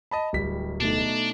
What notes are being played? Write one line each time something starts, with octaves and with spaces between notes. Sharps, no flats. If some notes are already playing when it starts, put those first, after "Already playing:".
D#5 A5 B5
D1 G3 B6
B2 A3 D4 D#4